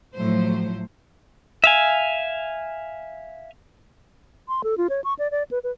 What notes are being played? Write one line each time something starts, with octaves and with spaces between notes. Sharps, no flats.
A2 F3 F#3 A3 C5
E5 F5 G#5
C6
A4
F4
C#5
C#6
D5
D5
B4
B4